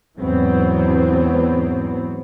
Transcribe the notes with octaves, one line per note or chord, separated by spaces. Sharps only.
E2 G#2 E3 F#3 B3 C4